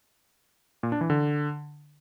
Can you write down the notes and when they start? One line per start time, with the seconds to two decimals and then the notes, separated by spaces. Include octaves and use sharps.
0.83 A#2
0.92 D4
1.01 E3
1.10 D3